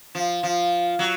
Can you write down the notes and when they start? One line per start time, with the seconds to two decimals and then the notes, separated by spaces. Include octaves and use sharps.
0.15 F3
0.43 F3
0.99 F#3